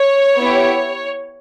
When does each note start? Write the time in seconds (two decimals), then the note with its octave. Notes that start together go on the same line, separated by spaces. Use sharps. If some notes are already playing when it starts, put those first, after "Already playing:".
Already playing: C#5
0.38 B3 E4 G4